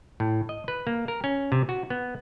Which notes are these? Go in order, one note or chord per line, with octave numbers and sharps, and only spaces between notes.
A2
D#5
B4
A#3
A#4
C#4
C3
F#4
B3